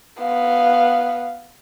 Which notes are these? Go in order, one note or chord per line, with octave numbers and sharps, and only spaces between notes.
B3 F5